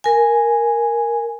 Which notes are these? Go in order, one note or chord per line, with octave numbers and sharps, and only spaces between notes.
A#4 G#5